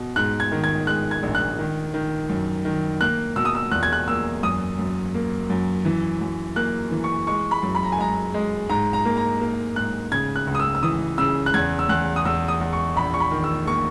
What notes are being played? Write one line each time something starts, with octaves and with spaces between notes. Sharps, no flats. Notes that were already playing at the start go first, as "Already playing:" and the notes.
Already playing: B2
G#2 F#6
G#6
D#3
G#6
G#3 F#6
G#6
A#1
F#6
D#3
D#3
F#2
D#3
A#3 F#6
B2 E6
D#6
E6
E2 F#6
G#6
F#6
A#3 E6
F#2 D#6
F#2
A#3
F#2
E3
F#2
A#3 F#6
E3
C#6
G#3 C#6
B5
F#2
B5
A#5
G#5
G#3 A#5
G#3
G#2 A#5
A#5
A#3
A#5
A#3
G#2 F#6
C#3 G#6
F#6
C#2
D#6
E6
E6
E3 D#6
C#3 E6
F#6
E2 G#6
E6
E2 F#6
D#6
E2 E6
D#6
E2
C#6
A#1 B5
C#6
B5
D#3
E6
A#3 C#6